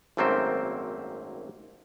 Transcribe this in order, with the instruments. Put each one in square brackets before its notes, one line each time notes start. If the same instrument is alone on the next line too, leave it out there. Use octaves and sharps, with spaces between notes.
[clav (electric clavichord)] G#1 F#2 A3 A#3 C4 C5